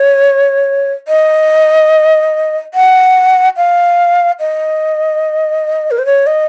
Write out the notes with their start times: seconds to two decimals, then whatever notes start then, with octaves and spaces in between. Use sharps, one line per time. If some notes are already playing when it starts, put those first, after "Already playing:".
Already playing: C#5
1.08 D#5
2.74 F#5
3.57 F5
4.40 D#5
5.91 A#4
5.99 C5
6.06 C#5
6.27 D#5